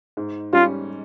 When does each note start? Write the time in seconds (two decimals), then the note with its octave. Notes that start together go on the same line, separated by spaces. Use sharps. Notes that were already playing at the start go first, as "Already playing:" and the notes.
0.17 G#2
0.53 G3 C#4 F4